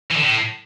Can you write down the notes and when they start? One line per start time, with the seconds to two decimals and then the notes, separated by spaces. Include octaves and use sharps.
0.11 E3
0.17 D3
0.22 A2